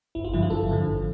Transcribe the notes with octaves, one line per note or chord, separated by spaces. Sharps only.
G1 E4
F4
G2 D3 F3 E4
F4
G1 A4
G2 D3 F3
G#1